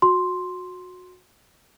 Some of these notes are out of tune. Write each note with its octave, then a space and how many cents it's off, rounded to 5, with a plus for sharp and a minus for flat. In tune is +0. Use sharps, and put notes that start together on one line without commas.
F#4 -25 C6 +0